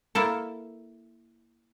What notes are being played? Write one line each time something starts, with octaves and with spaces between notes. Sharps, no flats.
A#3 E4 A4